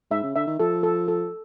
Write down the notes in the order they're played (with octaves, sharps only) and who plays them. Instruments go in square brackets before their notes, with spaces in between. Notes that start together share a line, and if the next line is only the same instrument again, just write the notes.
[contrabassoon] G#2 [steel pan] E5
[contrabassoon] C#3
[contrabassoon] D3 [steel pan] E5
[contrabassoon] D#3
[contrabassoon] F3 [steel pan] A4
[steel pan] A4
A4